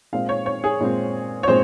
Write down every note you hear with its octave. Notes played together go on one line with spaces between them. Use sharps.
A#2 G#3 C4 F5
C#5
C#5
G#4
A#2 G#3 C4
C#5
A#2 G#3 C4 C5